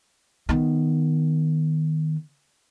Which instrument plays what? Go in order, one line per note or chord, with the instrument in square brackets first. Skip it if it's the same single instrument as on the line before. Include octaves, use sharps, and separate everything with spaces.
[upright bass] D#3 B3